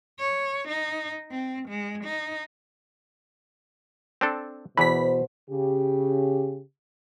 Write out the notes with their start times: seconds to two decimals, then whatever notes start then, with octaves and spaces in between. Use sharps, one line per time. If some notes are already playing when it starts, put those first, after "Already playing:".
0.19 C#5
0.69 D#4
1.31 C4
1.69 G#3
2.04 D#4
4.21 C4 D4 A4
4.77 E2 B2 E3 C5 B5 B6
5.50 C#3 G4